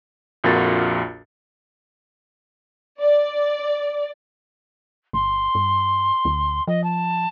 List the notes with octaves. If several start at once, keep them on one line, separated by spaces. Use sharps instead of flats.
A#1 F2 F4 F#4 A#4 A6
D5
G1 C6
G2
D2
F3 D#5
A5